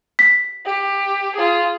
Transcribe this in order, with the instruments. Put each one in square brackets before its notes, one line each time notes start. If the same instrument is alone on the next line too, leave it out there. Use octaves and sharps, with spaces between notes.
[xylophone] B6
[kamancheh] G4
F4 G#4